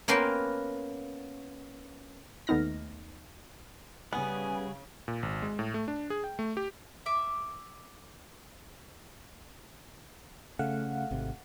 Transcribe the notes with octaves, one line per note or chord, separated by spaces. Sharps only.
A#3 B3 C#4 A#4 G5 C6
D#2 A3 B3 D#4 F6 A#6
C#3 G3 B3 G#4 F#5 G#5
A#2
G#1
G#3
A2
A3
D4
G#4
G5
A3
G4
E5 D6
C#3 A3 F5 F#5
G#1 C3